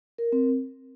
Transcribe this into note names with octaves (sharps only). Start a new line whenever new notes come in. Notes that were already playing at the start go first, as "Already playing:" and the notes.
A#4
C4